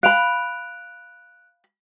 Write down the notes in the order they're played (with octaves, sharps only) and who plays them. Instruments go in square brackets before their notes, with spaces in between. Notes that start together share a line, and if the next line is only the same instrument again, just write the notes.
[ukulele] F5 B5 [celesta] F#6 D7 F7